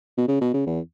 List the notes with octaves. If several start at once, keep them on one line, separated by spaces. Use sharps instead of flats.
B2
C#3
B2
C#3
E2